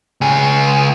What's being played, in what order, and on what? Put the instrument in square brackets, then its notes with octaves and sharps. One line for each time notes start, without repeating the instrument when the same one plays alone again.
[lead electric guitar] C#2 G#4